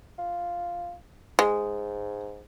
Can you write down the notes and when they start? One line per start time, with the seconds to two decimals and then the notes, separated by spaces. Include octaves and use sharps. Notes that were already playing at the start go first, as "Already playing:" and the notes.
0.18 F4
1.39 G#2 G#3